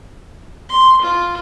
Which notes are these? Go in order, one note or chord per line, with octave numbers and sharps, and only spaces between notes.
C6
F4